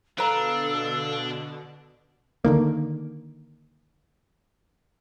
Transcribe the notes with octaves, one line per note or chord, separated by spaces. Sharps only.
B2 D3 D4 A4 B4 F5 A#5 E6
D3 D#3 A#3